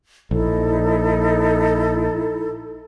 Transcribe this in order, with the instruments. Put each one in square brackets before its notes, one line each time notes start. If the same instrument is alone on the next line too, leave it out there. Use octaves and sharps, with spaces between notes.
[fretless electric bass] A#1 [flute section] D#4 E4 A4